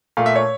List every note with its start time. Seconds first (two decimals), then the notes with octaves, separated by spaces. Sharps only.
0.17 A#2 A3 F5
0.26 E5
0.36 C#5